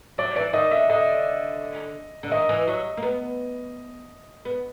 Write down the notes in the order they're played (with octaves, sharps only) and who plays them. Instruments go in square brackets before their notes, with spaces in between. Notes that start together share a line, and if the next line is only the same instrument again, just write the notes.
[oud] F#3 [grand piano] D5
[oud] E3 [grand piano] D5
[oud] D#3 [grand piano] D#5
[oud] D3 [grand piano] E5
[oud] D3 [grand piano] D#5
[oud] D3
[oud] D#3 [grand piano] D#5
[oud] E3
F#3
A#3
B3
B3